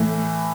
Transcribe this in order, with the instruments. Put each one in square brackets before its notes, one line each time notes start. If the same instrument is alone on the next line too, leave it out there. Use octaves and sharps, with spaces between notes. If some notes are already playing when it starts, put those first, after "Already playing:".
Already playing: [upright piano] A2 E3 A3